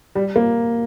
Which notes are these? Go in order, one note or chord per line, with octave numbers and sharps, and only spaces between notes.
G3
A#3